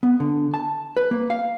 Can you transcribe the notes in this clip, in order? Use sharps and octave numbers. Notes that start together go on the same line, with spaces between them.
B3
D3
A5
B4
A#3
F5